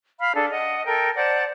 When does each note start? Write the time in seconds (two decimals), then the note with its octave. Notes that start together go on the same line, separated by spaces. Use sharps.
0.20 F5 B5 F6
0.35 D4 G#4 A4
0.51 D#5 F#5
0.86 A4 A#4 G5
1.16 C5 D5 F#5 A5